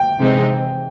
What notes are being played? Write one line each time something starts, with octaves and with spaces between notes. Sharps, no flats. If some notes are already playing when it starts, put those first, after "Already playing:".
Already playing: G5
C3 E3 G#3 C4 D#4